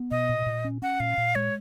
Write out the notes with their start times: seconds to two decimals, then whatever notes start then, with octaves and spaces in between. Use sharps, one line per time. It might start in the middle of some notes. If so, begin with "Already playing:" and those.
Already playing: B3
0.11 B2 D#5
0.29 A#2
0.46 A#2
0.64 C#4
0.82 C#4 F#5
1.00 A#2 F5
1.18 A#2
1.35 G#3 C#5